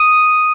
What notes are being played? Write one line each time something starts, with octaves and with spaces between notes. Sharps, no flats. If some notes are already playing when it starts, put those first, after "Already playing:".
Already playing: D#6 D#7